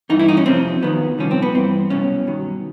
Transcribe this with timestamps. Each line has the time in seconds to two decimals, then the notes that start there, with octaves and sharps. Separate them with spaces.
0.10 G2 E3 D#4
0.20 E4
0.28 D#4
0.37 C#4
0.46 F2 C3 F3 C4
0.82 D#2 D#3 F#3 B3
1.18 C2 A#2 F3 C#4
1.31 C4
1.42 B3
1.55 G2 E3 C4
1.90 C2 B2 F#3 C#4
2.27 G2 D#3 F#3